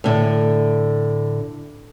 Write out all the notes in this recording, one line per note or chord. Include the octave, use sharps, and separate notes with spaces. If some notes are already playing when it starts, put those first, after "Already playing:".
A2 D3